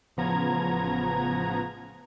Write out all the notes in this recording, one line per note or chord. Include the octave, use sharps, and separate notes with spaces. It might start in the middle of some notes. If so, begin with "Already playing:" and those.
A1 C#3 F3 B3 A#5 G#6